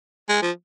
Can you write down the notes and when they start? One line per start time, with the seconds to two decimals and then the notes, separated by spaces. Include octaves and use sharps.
0.29 G#3
0.42 F3